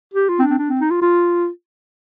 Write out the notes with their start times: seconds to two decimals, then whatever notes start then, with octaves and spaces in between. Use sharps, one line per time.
0.14 G4
0.29 F4
0.39 C4
0.42 D4
0.50 C4
0.58 D4
0.69 C4
0.80 D#4
0.90 F4
1.02 F4